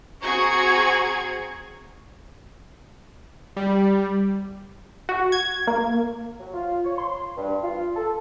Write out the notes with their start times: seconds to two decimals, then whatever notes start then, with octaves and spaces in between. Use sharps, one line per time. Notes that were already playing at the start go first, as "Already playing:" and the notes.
0.23 C4 F#4 G#4 A#5 C#6 G#6
3.57 G3
5.09 F#4
5.32 G#6
5.67 A#3
6.40 F#3
6.54 F4
6.85 C#5
6.98 C6
7.37 G2
7.64 F4
7.96 A4